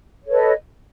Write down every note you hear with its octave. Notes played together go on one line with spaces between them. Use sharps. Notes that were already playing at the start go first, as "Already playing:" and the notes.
A4 B4 C#5 D#5